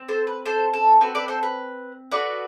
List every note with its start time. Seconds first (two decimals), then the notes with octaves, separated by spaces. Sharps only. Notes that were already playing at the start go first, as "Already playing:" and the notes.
Already playing: C4
0.08 A4 C5
0.27 B4
0.46 A4 C5
0.73 A4
1.01 C4 F#4 A4 B4
1.15 B4 D5
1.28 A4 C5
1.43 B4
2.12 B3 F#4 A4 B4 D5